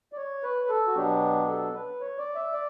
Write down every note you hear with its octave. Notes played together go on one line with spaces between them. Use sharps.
D5
C#5
B4
A4
F#4
B2 F#3 B3 D4 G4
A4
B4
C#5
D5
E5
D5